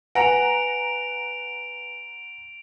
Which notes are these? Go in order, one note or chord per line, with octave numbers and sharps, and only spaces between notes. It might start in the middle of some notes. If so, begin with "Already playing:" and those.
B4 F#5 G#5 A#5 A#6 D7 F7